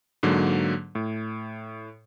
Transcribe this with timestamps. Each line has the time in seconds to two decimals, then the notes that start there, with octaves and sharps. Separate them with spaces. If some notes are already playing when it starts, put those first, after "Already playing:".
0.23 G#2 D3 F#3 A#3
0.95 A2